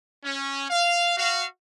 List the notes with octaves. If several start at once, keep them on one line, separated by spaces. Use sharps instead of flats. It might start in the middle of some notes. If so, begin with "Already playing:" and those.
C#4
F5
F#4 F5